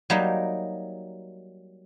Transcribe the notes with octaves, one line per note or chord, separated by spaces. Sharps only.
F#3 G3 A#3 D#4